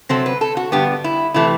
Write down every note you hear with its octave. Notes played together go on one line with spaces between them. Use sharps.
C3 F#3 C4 A4
B4
A4
F#4
G2 D3 G3 B3 G4
E4
C3 E3 A3 E4